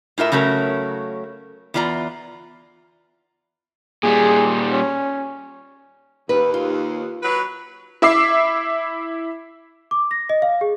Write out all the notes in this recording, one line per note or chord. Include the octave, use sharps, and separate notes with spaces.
A2 F4 A#4 E5
C#3 F#3 A3 C#4 A#4
E2 B3 F4 D5 A#5
A#2 G3 G#4
C#4
D#2 B4
F4
F#3 B4
E4 E5 D6 C7
D6
A#6
D#5
F5
G#4